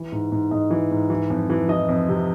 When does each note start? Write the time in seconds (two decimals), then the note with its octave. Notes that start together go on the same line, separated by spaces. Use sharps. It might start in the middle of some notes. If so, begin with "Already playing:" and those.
Already playing: E3
0.12 G#2
0.32 G#2
0.51 G#2 D#5
0.70 E3
0.91 G#2
1.10 E3
1.30 F2
1.50 E3
1.69 E3 D#5
1.89 F2
2.09 C3